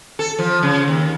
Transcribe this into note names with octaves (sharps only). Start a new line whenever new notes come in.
A4
F3
C#3
D#2